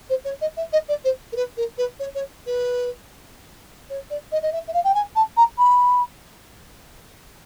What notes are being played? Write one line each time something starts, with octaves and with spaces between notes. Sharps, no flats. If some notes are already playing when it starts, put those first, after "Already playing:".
C5
C#5
D#5
E5
D#5
D5
C5
A#4
B4
A#4
B4
C#5
C#5
B4
C#5
D5
D#5
D#5
E5
E5
F5
G5
G#5
A5
A#5
B5